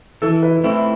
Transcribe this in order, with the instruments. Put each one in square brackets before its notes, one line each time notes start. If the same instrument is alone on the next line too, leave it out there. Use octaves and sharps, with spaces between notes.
[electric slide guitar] E3 [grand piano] A4
[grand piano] B4
B4
[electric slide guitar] A3 C4 E4 [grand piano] A4